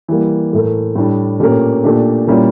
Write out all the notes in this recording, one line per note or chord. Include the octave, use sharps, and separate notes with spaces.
E3 G3 A#3
A2 E3 A3 E4 A#4
A2 G3 D4
A#2 A3 C#4 G4 A#4
A#2 A3 D4 G4
A#2 G3 C#4 E4 A#4